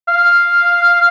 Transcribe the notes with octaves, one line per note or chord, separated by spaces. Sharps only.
F5